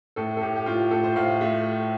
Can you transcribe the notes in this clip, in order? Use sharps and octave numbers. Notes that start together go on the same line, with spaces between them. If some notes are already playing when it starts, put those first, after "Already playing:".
A2 A4
A4
A2 G4
G4
A2 F4
G4
A2 A4
C5
A2 F5
A3